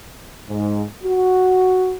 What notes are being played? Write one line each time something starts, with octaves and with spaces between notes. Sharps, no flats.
G#2
F#4